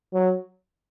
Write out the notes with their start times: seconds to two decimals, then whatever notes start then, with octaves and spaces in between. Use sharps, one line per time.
0.14 F#3